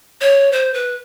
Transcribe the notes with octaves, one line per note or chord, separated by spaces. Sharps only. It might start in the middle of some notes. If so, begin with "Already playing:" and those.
C#5
C5
B4